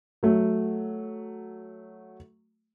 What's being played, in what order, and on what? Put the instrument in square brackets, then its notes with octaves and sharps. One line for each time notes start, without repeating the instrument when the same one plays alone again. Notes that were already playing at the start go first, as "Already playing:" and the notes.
[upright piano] F#3 A3